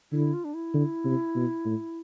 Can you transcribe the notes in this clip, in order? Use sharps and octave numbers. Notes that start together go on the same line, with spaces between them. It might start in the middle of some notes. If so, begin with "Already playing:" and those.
D3 E4
F4
D4
E4
D3
C3
B2
A2